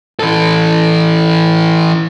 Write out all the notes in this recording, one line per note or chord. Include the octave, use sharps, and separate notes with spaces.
E3 A4